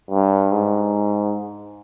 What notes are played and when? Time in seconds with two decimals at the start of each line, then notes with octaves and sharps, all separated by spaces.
0.11 G2
0.52 G#2